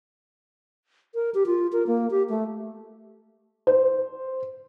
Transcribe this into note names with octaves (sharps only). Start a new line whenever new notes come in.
A#4
G4
F4
A#4
A#3
G4
A3
C5